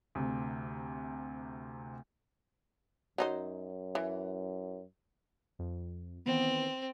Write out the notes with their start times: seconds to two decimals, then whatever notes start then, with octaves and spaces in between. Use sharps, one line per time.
0.15 D2 C3
3.18 F#2 F#3 D#4 C5
3.95 E3
5.59 F2
6.26 D#3 E3 B3 C4